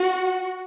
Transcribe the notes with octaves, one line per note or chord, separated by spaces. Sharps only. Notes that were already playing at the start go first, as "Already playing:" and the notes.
Already playing: F#4